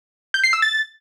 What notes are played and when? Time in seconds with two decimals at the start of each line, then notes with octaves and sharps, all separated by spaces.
0.34 G6
0.44 C7
0.53 E6
0.62 A6